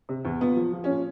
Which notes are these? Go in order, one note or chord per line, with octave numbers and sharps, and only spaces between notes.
C3
E2
A#2 B3
F3
F3
C#4
A#2